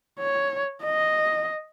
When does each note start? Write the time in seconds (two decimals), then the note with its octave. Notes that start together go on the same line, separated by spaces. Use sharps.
0.20 C#5
0.84 D#5